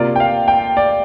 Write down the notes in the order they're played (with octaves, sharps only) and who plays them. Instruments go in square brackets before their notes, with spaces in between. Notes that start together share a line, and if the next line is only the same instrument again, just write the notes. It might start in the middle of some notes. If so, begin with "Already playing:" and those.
Already playing: [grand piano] C3 A#3 F4 D5
G5
F5
G5
D5